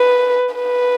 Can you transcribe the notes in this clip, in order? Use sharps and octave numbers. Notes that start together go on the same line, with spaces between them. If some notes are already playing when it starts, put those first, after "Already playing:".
Already playing: B4
B4